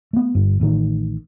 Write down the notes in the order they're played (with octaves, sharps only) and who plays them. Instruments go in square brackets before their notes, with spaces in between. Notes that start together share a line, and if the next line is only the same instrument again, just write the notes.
[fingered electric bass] A3 B3
G1 G2
A1 A2 D#3